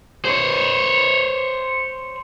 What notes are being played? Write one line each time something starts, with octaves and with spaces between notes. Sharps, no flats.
C5 C#5